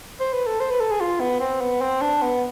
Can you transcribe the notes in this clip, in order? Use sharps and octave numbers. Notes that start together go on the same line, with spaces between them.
C5
B4
A4
C5
B4
A4
G#4
F4
B3
C4
B3
C4
D4
B3